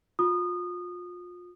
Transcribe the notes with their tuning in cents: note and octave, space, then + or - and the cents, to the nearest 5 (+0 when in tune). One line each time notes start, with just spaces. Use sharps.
F4 +30 D#6 -25